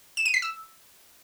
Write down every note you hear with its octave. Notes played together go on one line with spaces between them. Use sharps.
E7
D#7
B6
E6